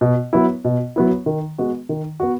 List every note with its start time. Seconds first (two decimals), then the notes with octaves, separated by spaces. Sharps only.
0.01 B2
0.33 F#3 B3 E4
0.65 B2
0.96 F#3 B3 E4
1.26 D#3
1.58 G#3 B3 F#4
1.89 D#3
2.20 B3 F#4